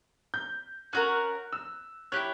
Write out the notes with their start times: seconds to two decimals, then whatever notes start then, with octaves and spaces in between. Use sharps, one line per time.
0.34 G6
0.93 C#4 F#4 A#4 F#6
1.53 E6
2.12 E4 G4 C#5 F#6